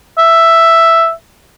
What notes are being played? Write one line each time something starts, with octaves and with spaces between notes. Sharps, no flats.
E5